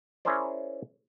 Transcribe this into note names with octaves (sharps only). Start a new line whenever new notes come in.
C#4 E4 G#4 A#4 C5 D5